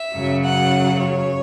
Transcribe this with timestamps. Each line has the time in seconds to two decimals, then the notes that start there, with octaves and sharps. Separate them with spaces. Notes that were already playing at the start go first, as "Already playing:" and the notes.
Already playing: E5
0.13 F#2 C#3 F#3
0.42 F#5
0.99 C#5